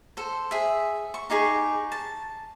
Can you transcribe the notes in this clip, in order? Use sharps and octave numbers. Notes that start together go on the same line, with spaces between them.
A4 C5
G#4 E5
C#6
D#4 G4 G#4 C#6
A5